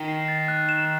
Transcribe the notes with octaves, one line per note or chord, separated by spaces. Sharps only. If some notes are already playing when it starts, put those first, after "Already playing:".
Already playing: D#3
C7
A6
F#6
E7